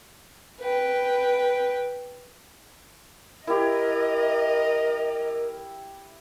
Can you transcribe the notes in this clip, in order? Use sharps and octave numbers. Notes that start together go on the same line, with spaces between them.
B4 G5
E4 G4 A#4 D#5